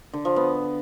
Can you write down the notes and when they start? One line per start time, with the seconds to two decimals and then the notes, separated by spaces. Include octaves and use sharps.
0.14 D3
0.25 F3
0.36 B3